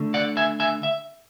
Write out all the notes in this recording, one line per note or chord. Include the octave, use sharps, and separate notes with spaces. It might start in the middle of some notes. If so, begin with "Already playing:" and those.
Already playing: D3 A3
D5 F#5
E5 G#5
E5 G#5
E5